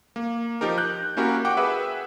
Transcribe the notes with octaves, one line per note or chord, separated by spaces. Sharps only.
A#3
F3 D#4 G4 A#4
F#6 G6
A#3 C#4 E4 F#4 G4 A#4
F#5 G5 D6
G#4 B4 E5 F#5